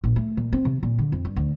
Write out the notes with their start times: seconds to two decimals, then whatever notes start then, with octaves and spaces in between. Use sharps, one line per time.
0.04 A#1
0.16 A3
0.37 A#2
0.53 C4
0.65 C3
0.83 A#2
0.98 D3
1.12 F2
1.25 G2
1.36 D2